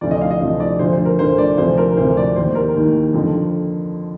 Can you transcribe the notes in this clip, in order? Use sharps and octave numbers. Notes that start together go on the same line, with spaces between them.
D2 C3 F3 D5
D#5
F5
D#5
D2 C3 F3
D5
D2 D3 F3 C5
C5
A#4
D2 D3 F3 C5
D5
D2 C3 F3 C5
A#4
D2 C3 F3 C5
D5
D#2 D#3 C5
A#4
D#2 D#3
F2 D3 F3